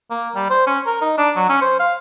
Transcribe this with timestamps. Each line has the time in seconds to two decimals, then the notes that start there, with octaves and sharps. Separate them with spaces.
0.10 A#3
0.35 G3
0.50 C5
0.67 C#4
0.86 A#4
1.01 D#4
1.18 D4
1.36 F#3
1.49 C#4
1.61 C5
1.80 F5